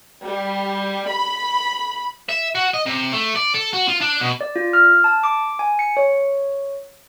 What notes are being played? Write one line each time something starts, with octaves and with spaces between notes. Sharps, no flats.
G3
B5
E5
F#4
D#5
C3
A3
D5
A4
F#4
F4
D4
B2
D5
F4
F6
A5
D6
G#5
C#7
C#5